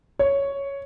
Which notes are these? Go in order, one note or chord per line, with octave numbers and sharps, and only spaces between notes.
C#5